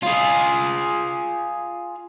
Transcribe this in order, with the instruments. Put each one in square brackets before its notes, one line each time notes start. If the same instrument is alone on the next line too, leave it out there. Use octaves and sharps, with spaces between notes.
[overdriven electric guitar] F4 G#4